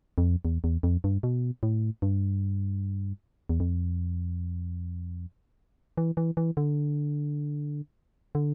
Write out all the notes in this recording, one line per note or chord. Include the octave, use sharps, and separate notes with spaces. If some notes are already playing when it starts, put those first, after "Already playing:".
F2
E2
E2
F2
G2
B2
A2
G2
E2
F2
E3
E3
E3
D3
D3